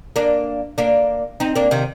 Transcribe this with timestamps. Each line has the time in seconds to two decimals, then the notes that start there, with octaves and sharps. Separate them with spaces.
0.16 A#3 D4
0.78 A#3 D4
1.40 C4 D#4
1.55 A#3 D4
1.71 C3 D#3